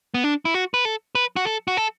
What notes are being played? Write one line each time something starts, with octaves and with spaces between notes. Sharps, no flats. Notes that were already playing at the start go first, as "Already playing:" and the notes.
B3
D4
E4
F#4
B4
A4
B4
F#4
A4
F#4
A4